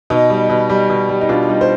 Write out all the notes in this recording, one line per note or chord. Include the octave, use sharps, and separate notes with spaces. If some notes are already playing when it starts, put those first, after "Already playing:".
B2 D#4
G3
B2
G3
B2
G3
D#4
B2 D4 F4
G3 D#4
C5